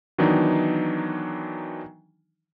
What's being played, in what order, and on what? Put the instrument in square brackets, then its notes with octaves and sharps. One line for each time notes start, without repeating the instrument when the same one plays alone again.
[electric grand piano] D#3 E3 F#3 B3 D4 D#4